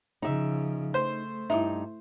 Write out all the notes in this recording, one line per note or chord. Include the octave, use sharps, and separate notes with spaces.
C#3 F3 D#4 E5
A3 C5
G2 D#4 E4 E5